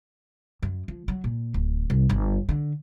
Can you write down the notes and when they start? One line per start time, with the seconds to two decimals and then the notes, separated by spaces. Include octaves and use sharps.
0.63 F#2
0.88 F3
1.08 F#3
1.24 A#2
1.54 D1
1.90 C2
2.10 G1
2.49 D3